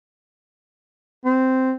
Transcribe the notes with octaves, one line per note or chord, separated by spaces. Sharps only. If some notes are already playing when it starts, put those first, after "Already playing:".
C4